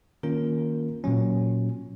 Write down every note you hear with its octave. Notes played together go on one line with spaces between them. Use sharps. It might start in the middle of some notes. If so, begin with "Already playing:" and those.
D#3 A#3 C#4 F4 A#4
A#2 F#3 C#4